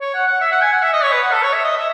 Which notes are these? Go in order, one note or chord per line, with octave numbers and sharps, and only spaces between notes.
C#5
F#5
F#5
E5
F#5
G#5
F#5
E5
D#5
C#5
B4
F#5
A4
C#5
E5
D#5
E5